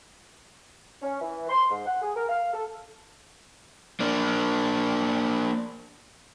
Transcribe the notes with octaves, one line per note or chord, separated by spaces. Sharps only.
C#4
E3
C6
G#2
F#5
G#4
A#4
F5
A4
A#3 D4